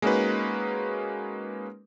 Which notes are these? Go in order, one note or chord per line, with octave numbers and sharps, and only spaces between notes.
G#3 A#3 C#4 D#4 F#4 B4